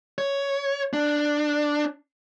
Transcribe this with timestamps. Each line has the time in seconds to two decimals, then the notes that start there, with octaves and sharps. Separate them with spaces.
0.18 C#5
0.93 D4